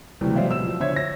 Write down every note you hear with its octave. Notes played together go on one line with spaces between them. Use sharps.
C3 E3 F#3 G3 A3
F#3 G#3 C5 D5 E5 F5
B2 E6 E7
F3
D3 C5 C#5 E5 G#6
A#6